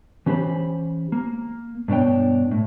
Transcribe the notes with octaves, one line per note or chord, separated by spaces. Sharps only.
E3 C#4 G4 C5 B5
A#3
G2 B2 D4 C#5 G5
A2